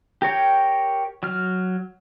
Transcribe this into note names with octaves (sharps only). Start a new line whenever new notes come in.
G4 A#4 C#5 G5
F#3 F6